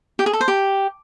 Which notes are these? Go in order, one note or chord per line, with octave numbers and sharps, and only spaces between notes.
G4
G#4
A4
C5
G4